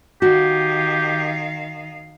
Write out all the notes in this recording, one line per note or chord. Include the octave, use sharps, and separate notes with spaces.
D#3 F#4 G4 F5